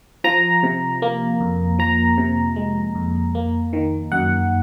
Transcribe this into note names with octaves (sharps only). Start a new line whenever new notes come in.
F3 A#5
C3
A#3
F2
F3 A#5
C3
G#3
F2
A#3
D#3
F#2 F#5